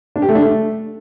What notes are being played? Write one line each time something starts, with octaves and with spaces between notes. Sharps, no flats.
D4
G4
A3
D4
A3